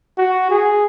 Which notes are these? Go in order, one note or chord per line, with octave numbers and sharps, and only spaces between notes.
F#4
G#4